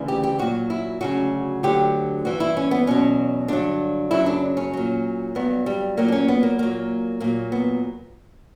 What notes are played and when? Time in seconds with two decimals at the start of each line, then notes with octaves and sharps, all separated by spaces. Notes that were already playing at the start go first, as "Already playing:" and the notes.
Already playing: D2 C#3 E3
0.08 G4
0.23 G4
0.39 A#2 F#3 F#4
0.70 E4
1.01 D2 C#3 F#3 F#4
1.63 D2 D3 F#3 G4
2.25 G2 E3 F#4
2.40 E4
2.57 C#4
2.71 B3
2.87 E2 B2 F#3 C#4
3.48 G2 D3 F#3 D4
4.11 F#2 C#3 F#3 E4
4.26 D4
4.57 C#4
4.73 A#2 F#3
5.35 G2 F#3 B3
5.66 G3
5.97 A#2 F#3 A#3
6.08 D4
6.12 C#4
6.28 B3
6.43 A#3
6.58 A#2 F#3 A#3
7.20 A#2 F#3 A#3
7.52 B3